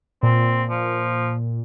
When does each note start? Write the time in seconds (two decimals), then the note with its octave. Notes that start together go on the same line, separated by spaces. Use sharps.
0.23 A#2 C4
0.70 F3